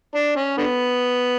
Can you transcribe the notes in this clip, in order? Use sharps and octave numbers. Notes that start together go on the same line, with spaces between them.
D4
C#4
D3 B3